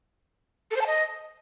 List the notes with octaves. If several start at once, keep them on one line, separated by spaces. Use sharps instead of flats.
A4
C5
A5
D#5